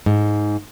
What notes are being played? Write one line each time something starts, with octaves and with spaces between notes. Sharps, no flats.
G#2